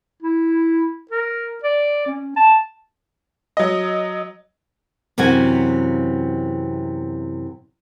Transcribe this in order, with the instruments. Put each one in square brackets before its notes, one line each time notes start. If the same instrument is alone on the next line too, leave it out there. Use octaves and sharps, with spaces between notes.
[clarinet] E4
A#4
D5
C#4
A5
[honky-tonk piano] F#3 D#5
[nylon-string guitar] F#2 C3 E3 F#4 G#5